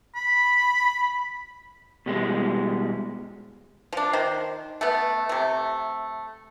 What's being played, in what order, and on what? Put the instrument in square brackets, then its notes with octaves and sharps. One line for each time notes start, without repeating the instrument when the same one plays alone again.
[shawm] B5
[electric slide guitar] B2 G3 G#3
[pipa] F3 D4
D#3 C5
A3 B3
C3 A3